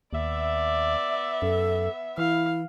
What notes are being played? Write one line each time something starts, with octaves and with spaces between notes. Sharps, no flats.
D#2 B3 D5 E5
F#2 A4
E3 E4 F5